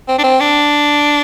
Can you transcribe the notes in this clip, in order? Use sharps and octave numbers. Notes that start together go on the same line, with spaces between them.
C4
D4
C4
D4